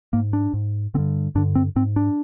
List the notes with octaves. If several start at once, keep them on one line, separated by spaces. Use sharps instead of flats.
G#2 A#3
D4
G#2
G2 D3 C4
G2 D3 D4
C4
G#2 C4
D4